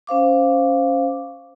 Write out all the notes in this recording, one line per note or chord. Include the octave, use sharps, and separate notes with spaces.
C#4 C5 F5 D6